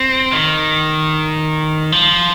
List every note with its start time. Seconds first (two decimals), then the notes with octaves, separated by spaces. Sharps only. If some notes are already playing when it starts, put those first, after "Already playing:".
Already playing: C4
0.33 D#3
1.92 F3